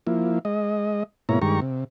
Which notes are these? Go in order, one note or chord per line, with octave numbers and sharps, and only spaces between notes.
F3 A#3 E4
G#3 D#5
G#2 B2 A#3 E4 C#5 A#5
G2 D#3 G#3 G4 A#5 C#6
C3